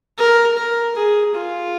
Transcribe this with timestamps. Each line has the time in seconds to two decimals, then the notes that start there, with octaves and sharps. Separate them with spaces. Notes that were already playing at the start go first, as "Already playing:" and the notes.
0.18 A#4
0.57 A#4
0.96 G#4
1.35 F4